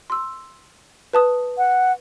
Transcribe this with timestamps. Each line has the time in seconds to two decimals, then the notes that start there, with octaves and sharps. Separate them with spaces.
0.10 C6 E6
1.13 B4 A5 D#6
1.58 F#5